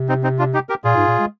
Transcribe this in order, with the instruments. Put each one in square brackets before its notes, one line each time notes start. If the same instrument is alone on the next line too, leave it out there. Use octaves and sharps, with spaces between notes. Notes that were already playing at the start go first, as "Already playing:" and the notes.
Already playing: [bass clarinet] C3
[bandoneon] C4 D#4
C4 D#4
D4 F4
D#4 G4
G4 A#4
[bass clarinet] A#2 [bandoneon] F4 G#4
[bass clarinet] G#2
A#2
G#3